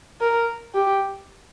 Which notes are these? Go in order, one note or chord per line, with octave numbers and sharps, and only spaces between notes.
A#4
G4